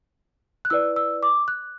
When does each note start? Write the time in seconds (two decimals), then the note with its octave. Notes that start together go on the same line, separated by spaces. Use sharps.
0.65 F#6
0.70 E4 B4 D5 E6
0.96 E6
1.23 D6
1.48 F#6